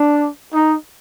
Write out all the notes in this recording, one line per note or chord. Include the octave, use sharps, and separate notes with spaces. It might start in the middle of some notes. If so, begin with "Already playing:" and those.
Already playing: D4
D#4